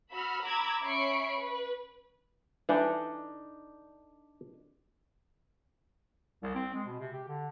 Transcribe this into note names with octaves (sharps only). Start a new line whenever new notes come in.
F#4 B5 E6 F6
A#5 B5 D6 E6 G#6
C#4 E5 B5 C#6 C7 D7
B4
E3 D4 D#4 A4 D5
C2
C4
G#3
B2
C3
G4
D3